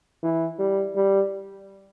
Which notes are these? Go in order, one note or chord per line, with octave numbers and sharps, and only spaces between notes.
E3
G3
G3